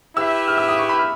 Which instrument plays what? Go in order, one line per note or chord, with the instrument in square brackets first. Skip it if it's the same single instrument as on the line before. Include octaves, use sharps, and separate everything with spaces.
[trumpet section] E4 G4 B4 E5 [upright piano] E6
[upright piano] F6
E6
D#6
C#6
B5
F6